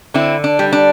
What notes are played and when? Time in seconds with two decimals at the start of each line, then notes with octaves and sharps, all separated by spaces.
0.14 D3 C4 E4
0.44 D4
0.59 G3
0.72 D4